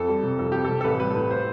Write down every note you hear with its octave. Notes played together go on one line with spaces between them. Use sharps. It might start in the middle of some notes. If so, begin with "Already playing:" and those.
Already playing: F2 A4
G3
C3
F2 A4
F2 G4
C3 A4
A4
A1 B4
G3 B4
A4
A2 B4
C5